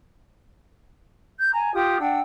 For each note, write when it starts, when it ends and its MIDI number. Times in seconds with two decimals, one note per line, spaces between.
1.39 1.50 91
1.51 1.70 80
1.51 1.70 82
1.73 1.96 65
1.73 1.96 67
1.73 1.96 87
1.99 2.19 62
1.99 2.19 78
1.99 2.19 79
1.99 2.19 88